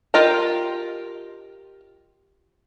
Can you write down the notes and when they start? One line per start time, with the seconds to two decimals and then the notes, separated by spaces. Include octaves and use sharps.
0.14 F4 G4 A#4 D#5 A#5